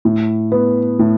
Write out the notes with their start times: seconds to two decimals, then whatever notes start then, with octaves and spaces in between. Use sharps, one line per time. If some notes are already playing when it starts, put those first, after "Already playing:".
0.05 A2
0.52 B3
0.99 A2